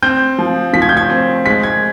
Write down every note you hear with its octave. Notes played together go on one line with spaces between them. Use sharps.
C4 G6
F3
F3 B6
G#6
G6
G#6
C4
G#3 B6
G#6